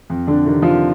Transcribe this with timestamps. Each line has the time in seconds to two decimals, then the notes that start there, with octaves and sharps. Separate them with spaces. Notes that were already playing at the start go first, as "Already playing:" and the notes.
0.10 F2
0.27 D3 D4
0.45 C3 D#3
0.62 F3 F4